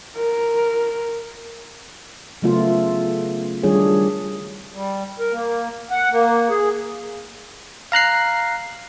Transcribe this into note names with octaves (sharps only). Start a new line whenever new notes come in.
A#4
C#3 F#3 A3 B3 F4
D#3 G3 D4 F4 G#4 C#5
G3
A#4
A#3
F#5
A#3
G#4
F5 A#5 F#6 C7